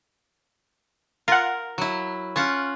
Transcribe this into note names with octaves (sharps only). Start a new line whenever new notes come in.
F4 A#4 F#5
F#3 E4
C#4 F4 F#5